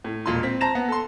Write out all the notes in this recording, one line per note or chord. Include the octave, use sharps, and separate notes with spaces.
A2
E1 A#2 C6
C4 B6
C5 A5 A#5 A#6 E7
B3
A4 C6